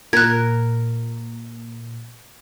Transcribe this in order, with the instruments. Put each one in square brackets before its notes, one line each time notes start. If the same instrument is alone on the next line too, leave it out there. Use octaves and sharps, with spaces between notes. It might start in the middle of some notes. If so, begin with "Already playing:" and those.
[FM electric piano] A#2 [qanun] A#4 [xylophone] F#6 G#6